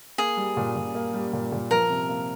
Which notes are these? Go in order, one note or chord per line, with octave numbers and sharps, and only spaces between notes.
A#3 G#4
G3
A#2
A#2
A#3
G3
A#2
A#2
F3 A#4
C3
A#3